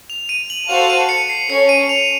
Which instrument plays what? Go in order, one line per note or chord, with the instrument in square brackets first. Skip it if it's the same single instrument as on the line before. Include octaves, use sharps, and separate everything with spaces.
[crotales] F7
D#7
F#7
[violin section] F#4 A4 C5 F5 A5 [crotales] F7
[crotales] D#7
C#7
C7
[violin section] C#4 A4 C#5 [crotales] C#7
[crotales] D#7
F7